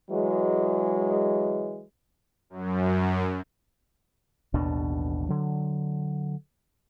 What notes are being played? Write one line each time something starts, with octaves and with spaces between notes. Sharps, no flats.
E3 F#3 G#3
F#2
A1 D#2 B2 D4
D3 F#3